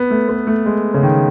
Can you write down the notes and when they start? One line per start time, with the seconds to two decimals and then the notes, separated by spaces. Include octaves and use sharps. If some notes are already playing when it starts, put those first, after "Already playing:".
Already playing: B3
0.10 A3
0.29 B3
0.47 A3
0.66 G#3
0.94 C#3
1.03 D#3